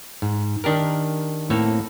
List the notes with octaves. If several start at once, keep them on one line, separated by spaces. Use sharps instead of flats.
G#2
D#3 D4 G4 A#4
A2 A#3 C4 A4 C#5